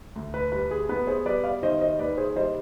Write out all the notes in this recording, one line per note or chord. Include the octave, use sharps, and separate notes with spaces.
D2
B4
G3 B4
G#4
B3 B4
G#4 C5
G3 B4 D5
D5 F5
D#3 C5 D#5
C5 D#5
D#2 B4 D5
G#4 C5
G3 C5 D#5